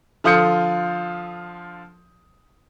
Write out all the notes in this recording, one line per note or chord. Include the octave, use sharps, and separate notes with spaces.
D3 F3 F4 D#6 G6 C#7